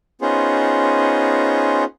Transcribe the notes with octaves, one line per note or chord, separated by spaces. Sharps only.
B3 C#4 D#4 F4 G#4 C5